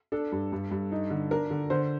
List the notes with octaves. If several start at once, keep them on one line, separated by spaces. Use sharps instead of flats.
D4 A4
G2
G2
G2
D#4
D3
D4 A#4
D3
D3 C5